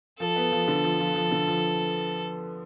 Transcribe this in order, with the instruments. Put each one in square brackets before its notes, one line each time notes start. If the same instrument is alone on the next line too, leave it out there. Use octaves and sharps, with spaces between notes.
[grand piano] F3 [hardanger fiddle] A4
[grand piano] B3
F3
D3
F3
F3
F3
D3
F3